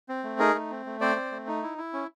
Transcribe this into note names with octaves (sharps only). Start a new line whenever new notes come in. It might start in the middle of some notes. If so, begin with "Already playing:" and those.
C4
A3
D#4 G#4 A#4
A3
C4
A3
C4 C5 D5
C4
A3
D#4
E4
E4
C#4